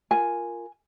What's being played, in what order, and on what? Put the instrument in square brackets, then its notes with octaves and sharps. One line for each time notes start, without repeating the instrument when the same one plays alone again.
[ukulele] F4 A#4 G#5